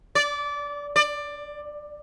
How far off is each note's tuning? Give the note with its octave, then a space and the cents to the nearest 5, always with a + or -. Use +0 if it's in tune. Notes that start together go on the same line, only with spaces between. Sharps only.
D5 -20
D5 +15